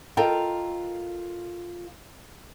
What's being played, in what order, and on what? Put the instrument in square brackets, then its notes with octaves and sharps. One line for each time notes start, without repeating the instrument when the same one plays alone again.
[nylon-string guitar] F4 A4 A#4 D#5 G5